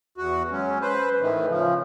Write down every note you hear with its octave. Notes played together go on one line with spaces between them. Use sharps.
E2 F#4
F#3 G#3 C#4
B4 C5
A2 D#3 E3
C#3 F3